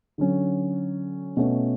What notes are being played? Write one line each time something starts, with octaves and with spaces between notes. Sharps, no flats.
D3 F#3 C#4
B2 A3 C#4